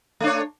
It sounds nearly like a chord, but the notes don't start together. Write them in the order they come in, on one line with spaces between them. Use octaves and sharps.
A3 D4 C#5